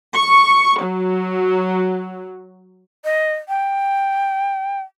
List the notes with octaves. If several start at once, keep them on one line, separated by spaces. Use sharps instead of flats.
C#6
F#3
D#5
G5